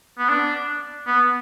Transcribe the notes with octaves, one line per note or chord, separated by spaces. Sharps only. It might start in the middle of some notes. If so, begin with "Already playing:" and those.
B3
D4
B3